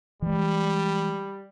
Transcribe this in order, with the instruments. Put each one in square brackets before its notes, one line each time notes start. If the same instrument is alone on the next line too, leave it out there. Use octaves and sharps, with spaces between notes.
[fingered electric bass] E3 G#3 [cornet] G3